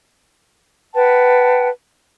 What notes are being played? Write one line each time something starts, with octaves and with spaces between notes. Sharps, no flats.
B4 F#5 G5 A5